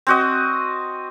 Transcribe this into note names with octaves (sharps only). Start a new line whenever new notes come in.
C4 F#4 D#5